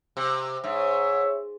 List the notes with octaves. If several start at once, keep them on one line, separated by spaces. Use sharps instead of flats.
C3
G#2 C#5 E5